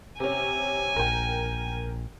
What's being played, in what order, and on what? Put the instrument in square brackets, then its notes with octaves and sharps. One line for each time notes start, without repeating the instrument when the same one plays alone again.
[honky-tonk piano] C3 C#4 [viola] G#5
[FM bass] A#1 [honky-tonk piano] A#4 G5